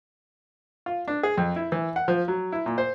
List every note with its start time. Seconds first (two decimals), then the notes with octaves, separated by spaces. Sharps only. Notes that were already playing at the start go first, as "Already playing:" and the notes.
0.86 F4
1.08 D4
1.23 G#4
1.37 F2
1.56 E4
1.72 E3
1.96 F#5
2.08 F3
2.28 F#3
2.52 E4
2.66 A#2
2.78 C5